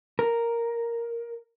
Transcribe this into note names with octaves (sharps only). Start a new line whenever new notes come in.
A#4